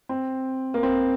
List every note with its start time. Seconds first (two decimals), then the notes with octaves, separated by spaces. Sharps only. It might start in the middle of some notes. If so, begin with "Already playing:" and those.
0.09 C4
0.74 A#3
0.83 C4